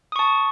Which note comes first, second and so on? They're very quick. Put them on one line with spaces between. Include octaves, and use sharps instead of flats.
D#6 C#6 A5